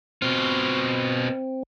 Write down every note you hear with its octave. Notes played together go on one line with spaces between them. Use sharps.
B2 C4 F4